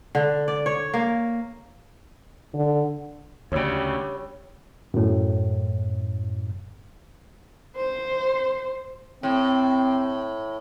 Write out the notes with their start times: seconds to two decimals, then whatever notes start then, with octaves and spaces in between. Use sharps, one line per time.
0.15 D3
0.48 D5
0.66 C#5
0.94 A#3
2.54 D3
3.52 D2 C#3 G3 C#5
4.94 F#2 A2
7.76 C5
9.23 A2 C4